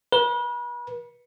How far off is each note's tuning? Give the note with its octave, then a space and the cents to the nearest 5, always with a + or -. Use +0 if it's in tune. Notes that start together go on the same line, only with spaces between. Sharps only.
B4 -40